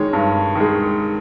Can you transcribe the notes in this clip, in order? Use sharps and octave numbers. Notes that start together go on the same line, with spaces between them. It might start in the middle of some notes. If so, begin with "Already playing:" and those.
Already playing: D#3 G#3 C#5
G2
D#3 G#3